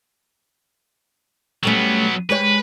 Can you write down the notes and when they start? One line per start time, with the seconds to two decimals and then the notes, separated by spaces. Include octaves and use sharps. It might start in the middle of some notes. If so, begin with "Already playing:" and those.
1.63 F#3 G3 A3 B3 C#4
2.30 G#3 G4 B4 C#5